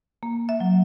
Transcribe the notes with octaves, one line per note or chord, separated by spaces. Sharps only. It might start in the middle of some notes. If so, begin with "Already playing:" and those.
A#3
E5
F#3